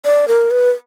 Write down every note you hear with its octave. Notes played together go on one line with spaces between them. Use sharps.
D5
A#4
B4